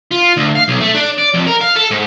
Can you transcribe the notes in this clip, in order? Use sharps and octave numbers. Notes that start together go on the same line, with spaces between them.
F4
D2
F5
B1
A3
D4
D5
F2
A#4
F5
A4
G#2